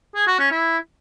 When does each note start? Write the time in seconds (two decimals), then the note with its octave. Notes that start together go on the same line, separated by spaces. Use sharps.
0.15 G#4
0.27 F#4
0.39 C#4
0.51 E4